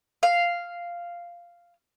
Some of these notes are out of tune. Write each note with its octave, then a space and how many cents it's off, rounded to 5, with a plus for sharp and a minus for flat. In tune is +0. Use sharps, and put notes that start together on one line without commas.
F5 -5